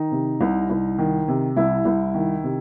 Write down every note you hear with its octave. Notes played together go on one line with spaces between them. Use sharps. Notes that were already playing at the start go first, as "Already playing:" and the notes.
Already playing: D#3 D#4
C3
C2
C2
D#3
C3
C2 E4
C2
D#3
C3